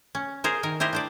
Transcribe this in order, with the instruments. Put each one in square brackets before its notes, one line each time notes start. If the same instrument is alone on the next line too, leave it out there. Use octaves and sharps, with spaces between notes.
[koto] C#4
G#4 A#4 C5
D#3 A#4
E4 G4 A#4 C5 D#5
D4 C5 D5